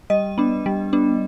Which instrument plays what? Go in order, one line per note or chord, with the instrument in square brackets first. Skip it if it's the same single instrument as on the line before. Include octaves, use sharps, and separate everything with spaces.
[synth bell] G3 D#5
B3 D4
G3
B3 D4